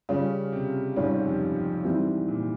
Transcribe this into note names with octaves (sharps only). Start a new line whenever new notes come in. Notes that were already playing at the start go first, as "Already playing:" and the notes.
C#3 G3 C#4 F4
C3
G#2 G3 C#4 F4
F2
F2
G#2 E3 G3 C4
A#2